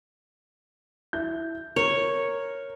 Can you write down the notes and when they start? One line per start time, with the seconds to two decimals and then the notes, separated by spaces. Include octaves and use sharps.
1.13 E4 G6
1.76 A#4 C#5